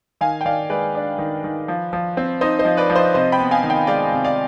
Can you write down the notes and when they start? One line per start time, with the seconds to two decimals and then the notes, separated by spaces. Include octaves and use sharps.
0.21 D#3 F5 G#5
0.41 G5
0.45 D#3 D5 F5
0.69 G#3 B4 D5
0.95 D4
1.18 D#3
1.44 D#3
1.68 F3
1.93 F3
2.17 C4
2.41 D#4 C5 D#5
2.59 C5 D#5
2.65 F3
2.77 B4 D5
2.90 F3
2.96 C5 D#5
3.14 C3 C5 D#5
3.32 G5 B5
3.38 B3
3.51 F5 G#5
3.63 D#3
3.70 D#5 G5
3.87 G#3 D5 F5
4.12 C3
4.24 D5 F5